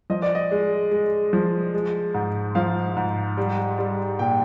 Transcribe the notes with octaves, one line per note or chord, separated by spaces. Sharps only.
F3 D#5
D5
D#5
G#3
G#3
F3
G#3
G#2
F3 F5
G#2
G3
G3
A#2 G5